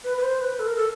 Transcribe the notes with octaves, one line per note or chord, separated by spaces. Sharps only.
B4
B4
C5
B4
A4
A#4
A4